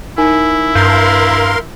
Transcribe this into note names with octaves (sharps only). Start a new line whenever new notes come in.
D#4 E4 A#4 G#5
G2 A#4 F5 C6 G6